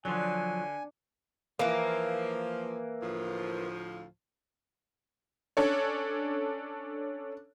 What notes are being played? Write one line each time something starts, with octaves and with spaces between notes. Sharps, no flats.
D3 F3 F#3 G#5
E3 F3 A#3
D2 A2 F3
C#4 D4 A4 C#5